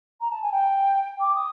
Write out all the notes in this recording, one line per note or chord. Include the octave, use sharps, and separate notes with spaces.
A#5
A5
G#5
G5
D6
D#6